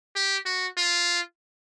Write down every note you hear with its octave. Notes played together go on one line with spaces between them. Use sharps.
G4
F#4
F4